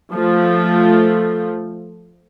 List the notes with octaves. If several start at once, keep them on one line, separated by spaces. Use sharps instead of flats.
F3 A3